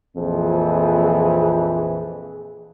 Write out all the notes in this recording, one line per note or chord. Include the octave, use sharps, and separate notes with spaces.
A#1 F2 E3 C4 G#4